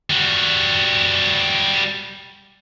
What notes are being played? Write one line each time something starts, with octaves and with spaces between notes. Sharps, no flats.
G3 F#4